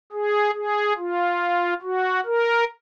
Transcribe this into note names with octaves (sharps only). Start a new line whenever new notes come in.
G#4
G#4
F4
F#4
A#4